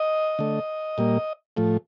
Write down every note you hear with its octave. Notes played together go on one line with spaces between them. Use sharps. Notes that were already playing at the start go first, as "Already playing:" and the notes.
Already playing: D#5
D3 A3
A#2 G3 A#3
A2 F3 A3